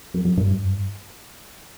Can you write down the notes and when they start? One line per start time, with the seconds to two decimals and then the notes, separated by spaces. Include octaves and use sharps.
0.14 F#2
0.25 F#2
0.38 G2
0.49 F#2
0.61 G2